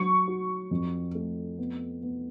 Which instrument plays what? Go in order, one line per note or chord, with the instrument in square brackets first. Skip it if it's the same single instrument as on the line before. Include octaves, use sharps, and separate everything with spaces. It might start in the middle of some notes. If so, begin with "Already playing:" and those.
Already playing: [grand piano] F#3 [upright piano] C#6
[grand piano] F#4
F2
A3
B3
B3